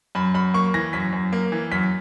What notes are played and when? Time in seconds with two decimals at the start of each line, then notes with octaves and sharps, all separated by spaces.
0.15 F#2 B5
0.34 F#2 B5
0.54 A#3 C#6
0.74 E3 A#6
0.93 F#2 B6
1.13 F#2
1.33 A#3
1.52 E3
1.72 F#2 B6